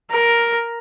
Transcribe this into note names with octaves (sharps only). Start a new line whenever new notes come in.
A#4